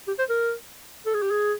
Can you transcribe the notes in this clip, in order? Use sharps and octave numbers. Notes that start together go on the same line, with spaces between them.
G4
C5
A#4
A4
G#4
G4
G#4